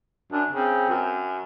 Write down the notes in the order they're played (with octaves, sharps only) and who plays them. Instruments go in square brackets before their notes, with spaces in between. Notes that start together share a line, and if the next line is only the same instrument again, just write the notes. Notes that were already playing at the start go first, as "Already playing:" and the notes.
[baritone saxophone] F#2 [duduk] D4
[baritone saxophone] C#3 [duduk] C4
[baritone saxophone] F#2